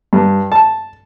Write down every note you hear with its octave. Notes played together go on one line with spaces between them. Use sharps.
G2
A5